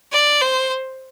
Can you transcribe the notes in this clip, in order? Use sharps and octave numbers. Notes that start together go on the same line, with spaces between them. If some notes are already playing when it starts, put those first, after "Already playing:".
D5
C5